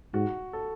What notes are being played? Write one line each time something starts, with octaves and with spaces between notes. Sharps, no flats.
G#2 F#4
A4